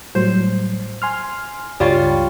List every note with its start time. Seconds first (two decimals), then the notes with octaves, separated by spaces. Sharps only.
0.15 A2 F#3 G3 C5
1.02 G#5 C6 F6
1.80 C#2 G2 G3 F4 C#5